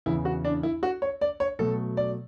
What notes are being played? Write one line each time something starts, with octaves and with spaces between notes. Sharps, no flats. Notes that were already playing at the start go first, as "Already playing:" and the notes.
E2 C#3 E3 E4
F#4
D4
E4
F#4
C#5
D5
C#5
B2 F#3 A3 A4
D5